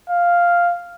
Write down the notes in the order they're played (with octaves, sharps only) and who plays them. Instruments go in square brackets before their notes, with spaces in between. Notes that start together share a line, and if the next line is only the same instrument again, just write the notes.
[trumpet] F5